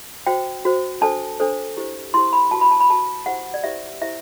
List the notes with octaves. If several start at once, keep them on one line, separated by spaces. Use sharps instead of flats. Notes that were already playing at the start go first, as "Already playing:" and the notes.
F#4 C5 G5
F#4 C5
D4 A4 C5 A5
D4 A4 C5
E4 G4 C5
E4 G4 C5 C6
B5
F#4 B4 A5
B5
A5
B5
F#4 B4 A5
E4 G4 C5 F#5
D5
E4 G4 C5 E5
E4 G4 C5 E5